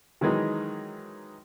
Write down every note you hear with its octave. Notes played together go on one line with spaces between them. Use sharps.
D#3 E3 F#3 G#3 D#4